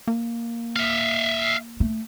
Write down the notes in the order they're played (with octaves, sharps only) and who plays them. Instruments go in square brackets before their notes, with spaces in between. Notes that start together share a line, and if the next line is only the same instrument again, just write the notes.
[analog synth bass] A#3
[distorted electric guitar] E5 F5
[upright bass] A3